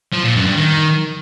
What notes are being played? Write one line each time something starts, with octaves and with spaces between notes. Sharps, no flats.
F3
A#2
F#2
G2
D#3